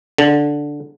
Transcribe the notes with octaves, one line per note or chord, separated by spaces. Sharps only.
D3